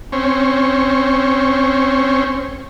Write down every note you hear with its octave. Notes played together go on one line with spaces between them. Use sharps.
C4 C#4